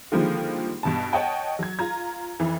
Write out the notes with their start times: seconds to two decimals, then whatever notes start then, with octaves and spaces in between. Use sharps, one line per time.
0.12 D3 D#3 F3 G3 G#3 A#3
0.83 G2 B2 A5
1.13 C#5 D#5 F#5 G5 A5
1.59 F#3 G#6
1.79 F4 A#5 G#6
2.39 F2 E3